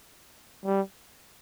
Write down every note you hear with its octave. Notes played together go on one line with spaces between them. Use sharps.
G3